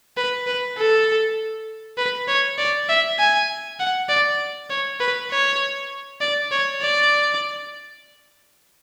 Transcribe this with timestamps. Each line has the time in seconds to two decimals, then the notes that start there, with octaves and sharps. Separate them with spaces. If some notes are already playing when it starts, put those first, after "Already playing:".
0.17 B4
0.47 B4
0.78 A4
1.98 B4
2.28 C#5
2.58 D5
2.89 E5
3.19 G#5
3.79 F#5
4.09 D5
4.70 C#5
5.00 B4
5.31 C#5
6.21 D5
6.52 C#5
6.81 D5